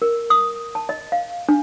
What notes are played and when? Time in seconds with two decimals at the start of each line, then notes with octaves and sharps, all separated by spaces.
0.02 A#4
0.30 D#6
0.75 A5
0.89 D#5
1.12 F5
1.49 D4